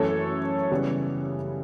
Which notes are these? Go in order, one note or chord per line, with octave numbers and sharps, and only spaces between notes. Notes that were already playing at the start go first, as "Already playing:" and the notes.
Already playing: F#2 E3 A3 A4 C#5
C#3 E3 G3 B3